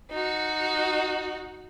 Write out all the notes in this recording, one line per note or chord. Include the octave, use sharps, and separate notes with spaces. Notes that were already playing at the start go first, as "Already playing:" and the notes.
D#4 F#4